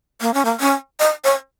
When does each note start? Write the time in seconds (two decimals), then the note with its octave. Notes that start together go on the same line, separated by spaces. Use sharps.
0.21 A#3
0.34 C#4
0.45 A#3
0.60 C#4
1.00 D#5
1.24 C#5